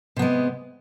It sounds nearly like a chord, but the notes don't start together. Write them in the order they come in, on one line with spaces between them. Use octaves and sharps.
C3 B3 G#3